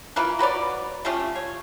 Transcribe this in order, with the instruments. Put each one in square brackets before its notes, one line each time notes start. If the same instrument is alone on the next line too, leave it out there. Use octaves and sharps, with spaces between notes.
[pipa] E3 F4 A#4 B4
F#4 B4 C#5 D5
G3 A3 C#4 F4
C#5